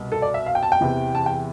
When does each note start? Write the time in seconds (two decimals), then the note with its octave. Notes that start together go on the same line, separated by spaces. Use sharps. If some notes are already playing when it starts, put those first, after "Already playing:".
Already playing: C2 B2
0.12 A4
0.22 D5
0.34 E5
0.46 F5
0.55 G5
0.63 A5
0.72 G5
0.81 E2 C3 E3
1.15 A5
1.26 G5